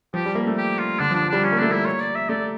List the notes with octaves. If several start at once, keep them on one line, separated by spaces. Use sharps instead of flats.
F3 G4
G3
A#3
A3
G4
F4
D3 D4
F3
D4
F3
G3 D4
C#4
A#3
A3 D4
A#3 E4
C#5
D5
E5
A3 D5